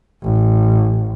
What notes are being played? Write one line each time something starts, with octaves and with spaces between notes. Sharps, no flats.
A1